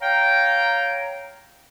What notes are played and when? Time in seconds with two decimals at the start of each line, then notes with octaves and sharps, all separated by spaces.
0.01 C#5 F5 G5 A#5